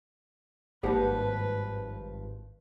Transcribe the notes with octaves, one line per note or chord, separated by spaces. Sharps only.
G#1 G2 F3 A#3 G4 B4 F#5